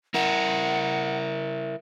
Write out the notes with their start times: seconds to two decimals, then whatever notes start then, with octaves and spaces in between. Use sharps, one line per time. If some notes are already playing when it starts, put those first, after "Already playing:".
0.14 E4 A#4 F#5